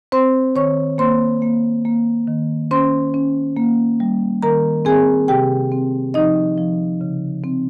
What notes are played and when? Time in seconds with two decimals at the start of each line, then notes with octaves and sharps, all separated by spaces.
0.12 C4 C5 C6
0.55 D#3 C#5 C#6
0.98 A#3 C5 C6
1.42 A#3
1.85 A#3
2.27 D#3
2.71 C#4 C5 C6
3.14 C#4
3.57 A#3
4.00 G3
4.42 D#3 A#4 A#5
4.85 C4 G#4 G#5
5.28 C3 G4 G5
5.72 C4
6.14 F3 D#4 D#5
6.58 F3
7.01 C#3
7.44 C4